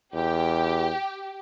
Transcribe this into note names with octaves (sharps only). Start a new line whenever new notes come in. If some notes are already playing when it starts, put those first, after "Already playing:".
E2 G4